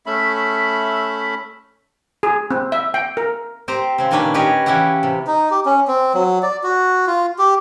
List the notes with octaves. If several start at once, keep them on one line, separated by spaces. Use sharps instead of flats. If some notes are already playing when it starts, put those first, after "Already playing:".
A3 C#4 E5 B5
G#4
C4
E5
G5
A#4
C4 G4 C5 A#5
C#3 C4
A#2 D#3 A#3 C#4 D4 B4
C#4 G4 B4 C#5 D#5
C#3 E3 C#4 E4 G4 F#5
C3
D#4
G4
C#4
C4
F#3
D5
F#4
F4
G4